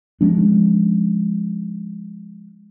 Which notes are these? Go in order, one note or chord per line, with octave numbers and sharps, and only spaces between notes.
F3 G#3 C#4 D4